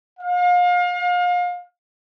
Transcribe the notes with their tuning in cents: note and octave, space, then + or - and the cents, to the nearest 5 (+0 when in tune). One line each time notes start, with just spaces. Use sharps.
F5 +35